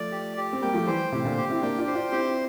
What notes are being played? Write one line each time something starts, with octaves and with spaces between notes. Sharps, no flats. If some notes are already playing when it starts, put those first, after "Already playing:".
Already playing: F3 A3 D5
G4
G4
C4
G3 A#3 G5
F3 A3
E3 G3 C5
A2 C3 G4
A#2 D3
G4
C4 E4
A#3 D4 G5
D4 F4
C5
D4 F4
C4 E4 G4